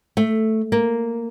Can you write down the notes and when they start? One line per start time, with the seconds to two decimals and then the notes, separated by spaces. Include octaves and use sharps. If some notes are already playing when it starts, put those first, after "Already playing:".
0.17 A3
0.72 A#3